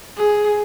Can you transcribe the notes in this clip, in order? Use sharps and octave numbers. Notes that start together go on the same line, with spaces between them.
G#4